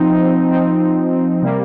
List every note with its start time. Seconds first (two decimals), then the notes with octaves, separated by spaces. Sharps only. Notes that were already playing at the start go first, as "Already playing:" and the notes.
Already playing: F3 C4 D#4
0.48 F3 C4 D#4
1.42 C3 G3 A#3